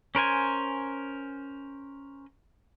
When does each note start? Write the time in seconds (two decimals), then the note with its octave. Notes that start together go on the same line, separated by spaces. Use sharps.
0.15 C#4 A#4 C5 G#5